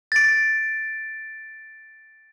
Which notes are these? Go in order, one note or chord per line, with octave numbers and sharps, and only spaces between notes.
A6 D7